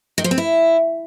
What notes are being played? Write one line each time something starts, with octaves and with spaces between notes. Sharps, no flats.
D#3
F3
C4
E4